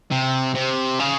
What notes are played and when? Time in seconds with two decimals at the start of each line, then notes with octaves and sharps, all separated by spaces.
0.11 C3
0.55 C3
1.00 C#3